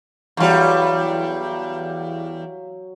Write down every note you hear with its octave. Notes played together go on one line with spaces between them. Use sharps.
E2 F#3 G3 F5 C6